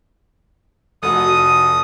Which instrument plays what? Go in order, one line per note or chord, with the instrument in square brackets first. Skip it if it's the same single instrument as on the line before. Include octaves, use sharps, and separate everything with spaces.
[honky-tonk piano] F1 F#4 [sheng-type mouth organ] D#6